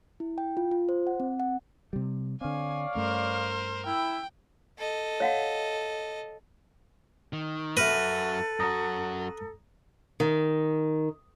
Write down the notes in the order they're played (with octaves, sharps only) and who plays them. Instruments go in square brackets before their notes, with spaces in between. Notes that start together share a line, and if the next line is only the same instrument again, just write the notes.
[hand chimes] E4
G5
F4
F4
C5
F#5
C4
F#5
[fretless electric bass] C3 G3
[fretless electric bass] D3 C4 [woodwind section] C#5 D5 F5 [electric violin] G#5
[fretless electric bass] G2 A3 C#4 [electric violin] A#4 C5
[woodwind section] E4 [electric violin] G5
[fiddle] A4 D#5
[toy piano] C#5 F5 F#5
[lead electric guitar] D#3
[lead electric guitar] F#2 F#4 [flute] A4 [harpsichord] B4 [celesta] E5 F6 A#6
[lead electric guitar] F#2 F#4 [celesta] A#5 D#6 A#6
[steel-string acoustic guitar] D#3